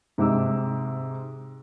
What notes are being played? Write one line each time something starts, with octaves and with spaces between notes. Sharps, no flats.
G#2 C3 D#4 D6 E6